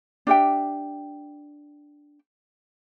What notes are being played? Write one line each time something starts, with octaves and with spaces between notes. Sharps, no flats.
D4 G4 E5 G5